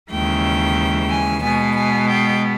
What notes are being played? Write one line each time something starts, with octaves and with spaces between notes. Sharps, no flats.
D#2 C#3 E3 G#3 G5
G#5
B2 G#3 B3 G#5
G#5
G5